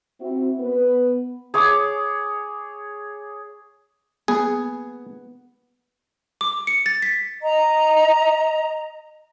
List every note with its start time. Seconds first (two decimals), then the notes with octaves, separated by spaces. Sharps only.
0.21 C4 E4 F#4
0.60 B3 B4
1.54 G#4 C#5 D6
4.28 B3 G#4
6.41 D6
6.67 C#7
6.86 A6
7.02 B6
7.42 D#5 A#5